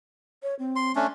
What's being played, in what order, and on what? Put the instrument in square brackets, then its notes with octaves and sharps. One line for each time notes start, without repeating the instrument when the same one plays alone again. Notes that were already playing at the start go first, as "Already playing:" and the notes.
[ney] C#5
C4
[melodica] C6
A3 C#4 D4